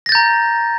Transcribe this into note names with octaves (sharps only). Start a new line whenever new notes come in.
A#5 G6 A6 A#6